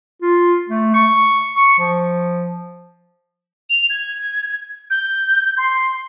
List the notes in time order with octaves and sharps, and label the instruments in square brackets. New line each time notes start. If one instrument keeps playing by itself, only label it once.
[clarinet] F4
A3
C#6
C#6
F3
[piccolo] F7
G#6
G6
C6